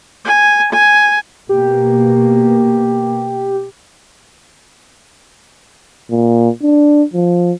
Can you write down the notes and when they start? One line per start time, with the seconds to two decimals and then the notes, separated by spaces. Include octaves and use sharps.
0.25 G#5
0.73 G#5
1.49 B2 A#3 G4
6.11 A#2
6.62 D4
7.14 F3